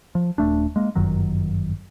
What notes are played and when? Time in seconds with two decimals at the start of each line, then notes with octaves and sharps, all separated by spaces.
0.15 F3
0.38 D#1 A3 D4
0.76 G#3 A#3
0.95 G1 F#2 D#3 F#3